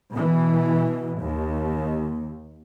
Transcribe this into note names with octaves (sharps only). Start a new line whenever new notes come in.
B2 E3
D#2